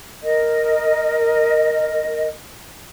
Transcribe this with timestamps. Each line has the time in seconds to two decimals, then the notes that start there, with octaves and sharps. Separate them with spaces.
0.23 A#4 D#5